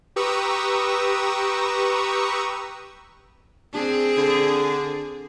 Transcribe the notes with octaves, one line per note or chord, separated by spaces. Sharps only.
G4 B4 A#5 C#6 D#6 E6
C4 D4 G#4
D3